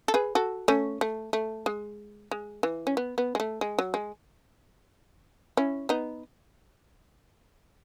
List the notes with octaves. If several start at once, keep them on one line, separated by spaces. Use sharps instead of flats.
A4
G#4 B4
F#4 A4
A3 C#4
A3
A3
G#3
G#3
E3
C#4
B3
B3
G#3
A3
G#3
F#3
G#3
C#4 E4
B3 D#4